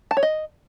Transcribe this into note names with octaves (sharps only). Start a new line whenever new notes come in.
A5
C#5
D#5